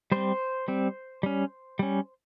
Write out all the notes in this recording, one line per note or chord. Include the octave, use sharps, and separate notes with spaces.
G3 C4 C5
G3 C4
G3 C#4
G3 C#4